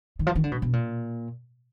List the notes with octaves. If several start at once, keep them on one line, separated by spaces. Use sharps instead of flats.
D#3
F3
D#3
D3
B2
B2
A#2